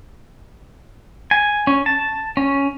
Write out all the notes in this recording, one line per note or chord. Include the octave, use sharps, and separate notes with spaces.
G#5
C#4
A5
C#4